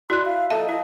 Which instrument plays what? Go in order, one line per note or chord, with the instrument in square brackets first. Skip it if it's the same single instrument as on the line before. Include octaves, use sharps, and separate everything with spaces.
[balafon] E4 [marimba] F#4 D5 F#6 [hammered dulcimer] E5 B5 [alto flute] C6
[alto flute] F5
[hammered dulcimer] A#2 F3 D#4 [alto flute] A4 [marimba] E5 [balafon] A5
[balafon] E4 [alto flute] D#5